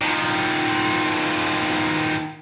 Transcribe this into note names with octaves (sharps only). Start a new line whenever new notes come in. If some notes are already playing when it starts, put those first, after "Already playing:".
D#3 F3